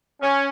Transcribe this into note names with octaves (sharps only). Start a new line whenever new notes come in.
C#4